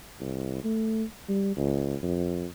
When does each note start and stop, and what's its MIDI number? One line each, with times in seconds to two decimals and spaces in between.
0.20 0.61 36
0.64 1.04 57
1.29 1.57 55
1.57 1.96 37
2.02 2.46 41